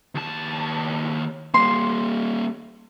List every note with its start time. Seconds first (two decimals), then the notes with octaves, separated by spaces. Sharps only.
0.15 D#2 A5
1.54 G3 A#3 C6